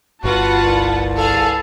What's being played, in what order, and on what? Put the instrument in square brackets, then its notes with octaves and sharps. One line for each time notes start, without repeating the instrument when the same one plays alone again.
[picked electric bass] G1 [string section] F4 B4 F#5 [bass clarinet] F#4 [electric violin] A5
[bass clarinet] C2
[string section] G#4 B4 F5 [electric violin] A4 A5